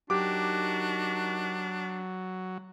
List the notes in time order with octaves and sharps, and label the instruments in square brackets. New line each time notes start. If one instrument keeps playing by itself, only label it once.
[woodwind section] D#3 D#4 F#4 [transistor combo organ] F#3 [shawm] D4 [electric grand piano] G4 D6